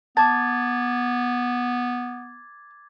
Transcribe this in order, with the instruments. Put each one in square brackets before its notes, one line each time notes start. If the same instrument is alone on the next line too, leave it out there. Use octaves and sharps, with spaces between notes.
[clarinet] B3 [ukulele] A5 [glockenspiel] D6 G#6 A6